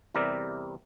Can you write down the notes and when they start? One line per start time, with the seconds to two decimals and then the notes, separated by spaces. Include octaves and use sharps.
0.15 E2 C3 G3 A#4 D5 E5